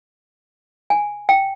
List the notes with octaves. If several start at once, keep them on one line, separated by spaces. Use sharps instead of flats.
G#5
G5